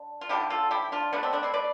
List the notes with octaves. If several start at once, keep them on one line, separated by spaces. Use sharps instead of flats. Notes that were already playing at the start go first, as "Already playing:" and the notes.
Already playing: D3
F4
D3 F3 A3 E4 G4
F4 A4
E4 G4
D4 F4
B2 A3 B3 D4
C4
B3 D4
C4 E4
B4 D5